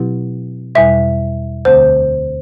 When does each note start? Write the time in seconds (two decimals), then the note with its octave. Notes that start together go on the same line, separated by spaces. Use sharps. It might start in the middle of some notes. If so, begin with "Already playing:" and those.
Already playing: B2 F#3 C4 E4 G4
0.75 E2 B2 G3 E5
1.65 D2 D3 A3 C4 C5